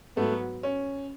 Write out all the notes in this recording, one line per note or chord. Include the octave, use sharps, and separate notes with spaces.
G#2 F#3 A3 B3
C#4